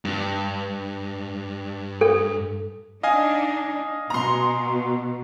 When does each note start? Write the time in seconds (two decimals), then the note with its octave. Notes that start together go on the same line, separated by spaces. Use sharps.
0.05 G2
2.01 A4
3.03 D4 D#4 D#5 F5 G#5
4.10 B2 A#5 C6